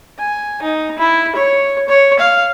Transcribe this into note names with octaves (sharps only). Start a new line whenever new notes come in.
G#5
D#4
E4
C#5
C#5
F5